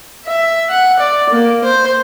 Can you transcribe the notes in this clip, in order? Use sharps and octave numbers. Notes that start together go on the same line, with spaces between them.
E5
F#5
D5
A#3
C5